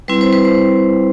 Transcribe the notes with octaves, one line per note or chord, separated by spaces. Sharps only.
G3 C4 E4 B4
C5
B4
C5